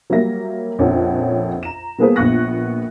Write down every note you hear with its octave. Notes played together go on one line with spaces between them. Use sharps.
F#3 G3 A#3 E5 A#6
A#1 F2 C#4 A4 F#5
A#5 E7
G3 A#3 B3 G#4 A4 B4
A#1 A#2 B3 C#6 F#6 A#6